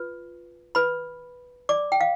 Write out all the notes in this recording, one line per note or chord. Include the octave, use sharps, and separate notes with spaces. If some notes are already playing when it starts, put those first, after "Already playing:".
Already playing: F4 B4
B4 B5
D5 D6
G5
F5